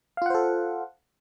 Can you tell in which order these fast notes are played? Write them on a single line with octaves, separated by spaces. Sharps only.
F5 F4 F#5 C5 A4